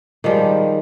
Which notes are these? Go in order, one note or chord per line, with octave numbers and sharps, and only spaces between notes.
D#3 F3 G3 G#3